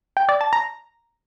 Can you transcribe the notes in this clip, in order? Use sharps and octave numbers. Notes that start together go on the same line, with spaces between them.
G5
D5
A5
A#5